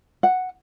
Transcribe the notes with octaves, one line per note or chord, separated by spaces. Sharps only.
F#5